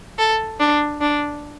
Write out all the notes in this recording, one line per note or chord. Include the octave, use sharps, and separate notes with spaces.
A4
D4
D4